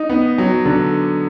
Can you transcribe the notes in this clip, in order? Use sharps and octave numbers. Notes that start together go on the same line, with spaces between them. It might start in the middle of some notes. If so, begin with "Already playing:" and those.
Already playing: D#4
B3
F#3
D3